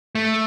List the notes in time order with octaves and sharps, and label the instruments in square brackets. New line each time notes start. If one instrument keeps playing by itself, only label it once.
[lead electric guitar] A3